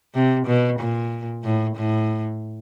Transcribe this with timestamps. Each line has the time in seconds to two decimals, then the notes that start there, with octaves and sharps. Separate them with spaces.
0.15 C3
0.47 B2
0.80 A#2
1.44 A2
1.76 A2